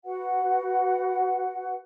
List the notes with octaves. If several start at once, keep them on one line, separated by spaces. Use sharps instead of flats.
F#4 B4 F#5